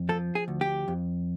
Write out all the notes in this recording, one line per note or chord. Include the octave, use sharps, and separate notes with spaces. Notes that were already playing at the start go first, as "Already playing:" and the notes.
Already playing: F2
F3 A4
G#4
D2
G4
F2